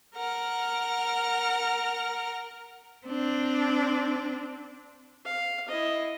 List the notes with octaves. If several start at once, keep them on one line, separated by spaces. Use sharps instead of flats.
A#4 F#5 F6
C4 D4
F5
E4 D#5